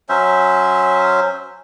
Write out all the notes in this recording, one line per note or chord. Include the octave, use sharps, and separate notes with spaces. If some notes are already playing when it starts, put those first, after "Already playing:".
F#3 C#4 C5 E5